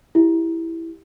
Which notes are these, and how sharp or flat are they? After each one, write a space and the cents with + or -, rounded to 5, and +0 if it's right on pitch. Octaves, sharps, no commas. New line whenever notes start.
E4 +0 G4 +10